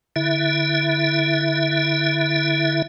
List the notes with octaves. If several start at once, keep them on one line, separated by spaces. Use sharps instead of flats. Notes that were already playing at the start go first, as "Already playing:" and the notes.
D3 E4 E5